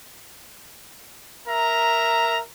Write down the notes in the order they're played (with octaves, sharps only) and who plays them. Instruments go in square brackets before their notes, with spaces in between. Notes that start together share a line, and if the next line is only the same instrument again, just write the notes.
[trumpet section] A#4 E5 A#5